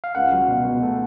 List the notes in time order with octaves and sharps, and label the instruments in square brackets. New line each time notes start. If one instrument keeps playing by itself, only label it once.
[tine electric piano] F5
[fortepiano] C#2 [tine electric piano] F#5
[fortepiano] F#3
B2
B2
A3